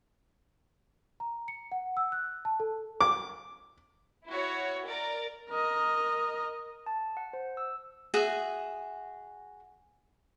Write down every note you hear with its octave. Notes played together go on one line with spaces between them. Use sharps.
A#5
C#7
F#5
E6
F#6
A5
A4
D6
E4 F#4 C#5
A#4 D5
A#4 D#5
A5
F#5
C5
E6
F#4 G#4 E5